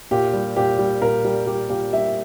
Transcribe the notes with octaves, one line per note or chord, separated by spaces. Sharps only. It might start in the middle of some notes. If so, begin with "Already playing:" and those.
A#2 G4
G3
A#2 G4
G3
A#2 A#4
G3
G3 G4
A#2 G4
G3 E5